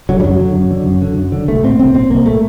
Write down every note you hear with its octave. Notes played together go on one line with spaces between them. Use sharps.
D3 F#3
G3
F#2 F#3
D3
F#2
D3
F#2
D3
F#2
D3
C2 A3
A#2 C4
C2 C4
A#2 C4
C2 A#3
A#2 A3